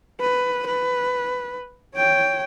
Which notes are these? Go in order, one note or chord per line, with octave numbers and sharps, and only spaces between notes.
B4
B4
C#5 G5